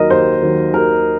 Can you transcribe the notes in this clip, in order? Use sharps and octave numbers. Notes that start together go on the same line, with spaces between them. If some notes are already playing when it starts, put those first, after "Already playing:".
Already playing: D#2 D#3 F#3 A#4 D#5
D#2 C5
D#3 F#3
D#2 A#4